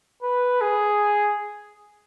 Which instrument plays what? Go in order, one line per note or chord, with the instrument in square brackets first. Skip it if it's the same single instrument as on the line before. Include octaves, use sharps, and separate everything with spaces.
[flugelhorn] B4
G#4